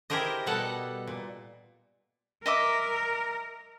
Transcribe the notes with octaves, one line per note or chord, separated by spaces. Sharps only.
E4 G4 G#4 A#4 C5 D#5
B2 G3 A4 D#5 F#5
A#2
A#4 D#5 E5 D6